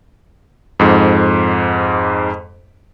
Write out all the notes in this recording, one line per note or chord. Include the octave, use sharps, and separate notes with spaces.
F2 G#2